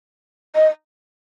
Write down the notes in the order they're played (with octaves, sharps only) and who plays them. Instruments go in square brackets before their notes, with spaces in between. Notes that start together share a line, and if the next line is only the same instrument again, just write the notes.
[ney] D#5